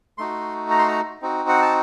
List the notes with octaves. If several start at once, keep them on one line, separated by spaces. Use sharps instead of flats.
A3 D#4 F#4 C6
A#5
C6
A#5
C4 D#4 F#4
F#5
A5